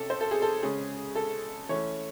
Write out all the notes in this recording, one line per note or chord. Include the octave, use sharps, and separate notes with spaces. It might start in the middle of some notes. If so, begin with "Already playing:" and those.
Already playing: C3 C#4 A4
C5
A4
G#4
A4
C#3 G#3 C#4 G#4
A4
E3 A3 C#4 C#5